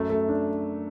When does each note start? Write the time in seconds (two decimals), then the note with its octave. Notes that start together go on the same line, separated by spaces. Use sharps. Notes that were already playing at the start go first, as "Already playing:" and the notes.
Already playing: F#2 A3
0.10 A3
0.29 D4